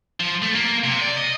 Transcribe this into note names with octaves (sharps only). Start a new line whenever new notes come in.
F3
A3
A#3
C3
D5
D#5